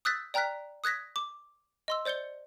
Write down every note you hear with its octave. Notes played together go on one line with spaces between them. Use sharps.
D#6 E6 F#6 G6 A6 B6
D5 G5 A#5 F6 F#6 B6
D#6 F#6 G#6 A#6 B6
D6
D#5 C6 E6
C5 D5 G6 C#7 G7